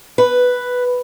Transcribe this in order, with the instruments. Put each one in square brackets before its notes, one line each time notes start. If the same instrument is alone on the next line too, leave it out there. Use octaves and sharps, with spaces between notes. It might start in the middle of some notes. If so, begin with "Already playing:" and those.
[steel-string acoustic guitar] B4